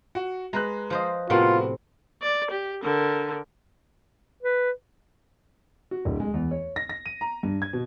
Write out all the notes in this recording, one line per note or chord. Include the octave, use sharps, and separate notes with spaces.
F#4
G#3 B4 A#5 F#6
F3 C5 D#5
A2 C3 B3 C4 F4 F#4 A#4
D5
G4
D3 A#4
B4
F#4
D1
G#3
E2
C#5
A#6
A#6
D#7
A#5
G2
G#6
B2